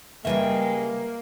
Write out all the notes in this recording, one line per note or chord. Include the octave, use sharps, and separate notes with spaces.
C#3 G3 G#3 A#3 B4 E5 G5